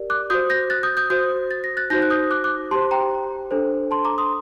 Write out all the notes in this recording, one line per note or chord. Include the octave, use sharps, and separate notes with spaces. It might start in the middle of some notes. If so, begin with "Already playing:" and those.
Already playing: G4 A#4 D5
D6 F#6
F#4 C5 D#6 G6
G6 A#6
F#6 A6
D#6 G6
D#6 G6
F#4 C5 D#6 G6
A6
A#6
F#6 A6
D#4 F#4 C5 G6 A#6
F#6
D#6 G6
D6 F#6
D6 F#6
G4 C5 A5 C6
G5 A#5
D4 A4 C5
A5 C6
A#5 D6
C6 D#6